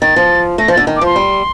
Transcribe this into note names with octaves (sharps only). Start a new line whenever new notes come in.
D#3 A6
F3
A3 A#6
F3
D3 A6
D#3
D6
F3 C6
G3